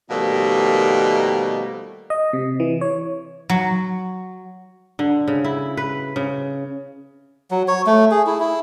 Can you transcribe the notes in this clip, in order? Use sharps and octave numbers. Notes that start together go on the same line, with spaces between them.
B2 D#3 F3 G3 A3 A#3
D#5
C3
E3
C#5
F#3
D3
C#3
E4
B4
C#3
F#3
C#5
A3
G#4
E4
E4